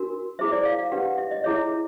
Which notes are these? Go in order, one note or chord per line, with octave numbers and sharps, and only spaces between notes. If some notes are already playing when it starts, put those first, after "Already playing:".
Already playing: D4 F#4 A#4
E4 G#4 C5 E5
D5
F5
F5
D4 G4 B4 F#5
E5
D#5
E4 G#4 C#5 E5